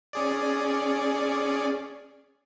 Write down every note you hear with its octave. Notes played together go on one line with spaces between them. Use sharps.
C#4 G#4 D5